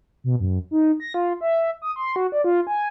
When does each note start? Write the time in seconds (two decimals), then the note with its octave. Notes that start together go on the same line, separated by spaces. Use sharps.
0.24 B2
0.40 F#2
0.71 D#4
1.00 A#6
1.14 F4
1.41 E5
1.82 D#6
1.96 C6
2.16 F#4
2.32 D5
2.44 F4
2.67 G#5